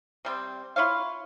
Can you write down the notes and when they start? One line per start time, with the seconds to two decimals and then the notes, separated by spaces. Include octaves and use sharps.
0.25 C3 G3 C4
0.76 E4 F4 C#5 F5